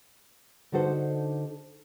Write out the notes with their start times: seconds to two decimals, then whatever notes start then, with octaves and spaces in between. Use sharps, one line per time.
0.72 D3 D4 D#4 F#4 A4 C5